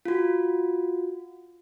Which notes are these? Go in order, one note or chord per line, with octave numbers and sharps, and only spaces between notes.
F4 F#4